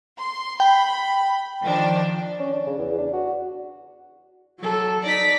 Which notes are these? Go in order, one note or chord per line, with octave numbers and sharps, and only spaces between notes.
C6
G5 B5
D#3 F3 D4
C#4
D4
C#3
E2
D4
F#4
F#3 A4
D#4 D5 A#6 B6